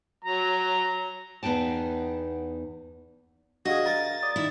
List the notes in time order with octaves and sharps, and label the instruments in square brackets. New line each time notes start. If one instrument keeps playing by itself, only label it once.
[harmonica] F#3 A#5
[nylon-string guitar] E2 B3 D#4 G5 A5
[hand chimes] D4 F5 [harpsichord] F#4 G#4 [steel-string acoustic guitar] D#5 [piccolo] A#6
[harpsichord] A#4 [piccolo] A6
[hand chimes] D5 D6 D#6
[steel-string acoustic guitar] D#3 E4